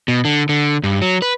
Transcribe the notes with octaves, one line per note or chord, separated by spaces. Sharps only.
B2
D3
D3
G2
F#3
B4